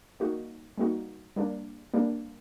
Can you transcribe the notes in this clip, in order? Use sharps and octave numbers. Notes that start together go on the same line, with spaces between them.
G3 A#3 D#4 F#4
G3 A#3 D#4 F#4
G3 A#3 D4
G3 A#3 D4